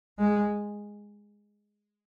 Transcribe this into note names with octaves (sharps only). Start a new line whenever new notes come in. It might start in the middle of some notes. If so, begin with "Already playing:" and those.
G#3